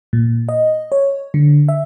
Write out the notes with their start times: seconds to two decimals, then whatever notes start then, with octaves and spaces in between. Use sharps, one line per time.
0.13 A#2
0.49 D#5
0.92 C#5
1.34 D3
1.69 E5